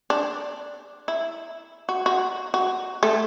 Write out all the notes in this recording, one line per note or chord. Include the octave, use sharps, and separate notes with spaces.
D4
E4
F#4
F#4
F#4
A3